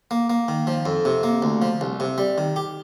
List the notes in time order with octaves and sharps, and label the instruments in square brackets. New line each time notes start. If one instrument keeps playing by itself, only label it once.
[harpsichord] A#3
A#3
D#3
F3
F2
C3
A#3
D2
F3
C2
C3
G3
D#3
G4